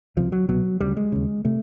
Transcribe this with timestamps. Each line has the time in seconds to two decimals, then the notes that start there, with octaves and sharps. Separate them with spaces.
0.17 C#2 C3 F3
0.32 F#3
0.49 C2 B2 F#3
0.80 D2 C#3 G3
0.97 G#3
1.12 D#2 C#3
1.45 C3 A3